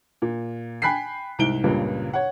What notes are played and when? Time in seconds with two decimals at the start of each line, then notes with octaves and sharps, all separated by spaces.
0.22 A#2
0.82 G5 G#5 B5 F#6 B6 C7
1.39 C2 G#2 D7 G7
1.64 C#2 G2 A#2 C#3
2.13 C#5 F#5